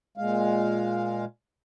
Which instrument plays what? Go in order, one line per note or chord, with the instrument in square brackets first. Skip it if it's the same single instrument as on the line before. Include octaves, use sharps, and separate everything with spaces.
[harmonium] A#2 G#3 F5